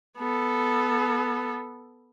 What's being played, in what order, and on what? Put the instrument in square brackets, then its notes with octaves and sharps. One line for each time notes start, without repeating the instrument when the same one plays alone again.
[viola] B3 A4